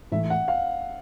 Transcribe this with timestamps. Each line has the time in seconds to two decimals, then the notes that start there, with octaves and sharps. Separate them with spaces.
0.12 A2 E3 A3 E5
0.30 F#5
0.48 F5